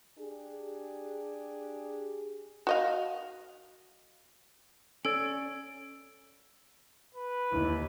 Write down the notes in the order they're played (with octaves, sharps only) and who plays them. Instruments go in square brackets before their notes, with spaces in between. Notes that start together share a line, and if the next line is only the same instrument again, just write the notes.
[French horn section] D4 G4 G#4
[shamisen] F#4 D#5 F5
[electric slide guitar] C#4 C#5 D5 [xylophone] A4 [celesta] E6 D7
[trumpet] B4
[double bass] D#2 [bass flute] E4